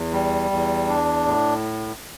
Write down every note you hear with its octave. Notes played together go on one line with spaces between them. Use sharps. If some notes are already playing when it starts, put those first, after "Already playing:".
Already playing: E2
G3
E2
D4
A2